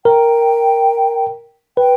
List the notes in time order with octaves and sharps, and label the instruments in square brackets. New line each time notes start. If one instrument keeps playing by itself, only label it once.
[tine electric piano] A#4 [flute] G5
[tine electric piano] B4 [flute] G5